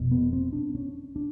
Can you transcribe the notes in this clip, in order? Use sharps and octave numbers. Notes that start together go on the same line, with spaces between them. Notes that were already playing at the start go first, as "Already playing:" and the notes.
Already playing: F1 B2
B3
C4
D4
C#4
D4